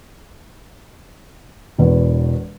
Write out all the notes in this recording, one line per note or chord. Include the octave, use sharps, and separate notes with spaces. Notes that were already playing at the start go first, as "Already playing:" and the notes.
E1 E2 B4